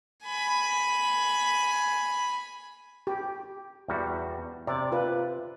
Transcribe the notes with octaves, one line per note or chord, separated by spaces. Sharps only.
G#5 B5
G4
E2 G3 F#4
C3 D5
F4 B4